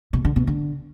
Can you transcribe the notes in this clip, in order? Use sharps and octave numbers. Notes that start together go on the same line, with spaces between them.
B2
D3
B2
D3